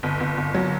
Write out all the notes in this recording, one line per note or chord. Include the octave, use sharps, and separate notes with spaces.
G1
G1
G1
F#3